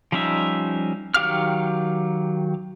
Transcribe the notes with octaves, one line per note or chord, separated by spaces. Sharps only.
F3 G3 C#4 D#4 E5
D#3 F#3 G4 F5 F6